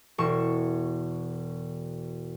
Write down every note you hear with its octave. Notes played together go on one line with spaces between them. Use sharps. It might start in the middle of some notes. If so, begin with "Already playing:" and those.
E1 C#6 E7